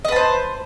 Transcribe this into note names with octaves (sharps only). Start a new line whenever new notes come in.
B4 C5 D#5 A5